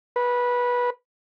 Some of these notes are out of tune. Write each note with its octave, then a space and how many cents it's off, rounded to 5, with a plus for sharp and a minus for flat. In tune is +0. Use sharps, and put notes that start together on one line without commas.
B4 -15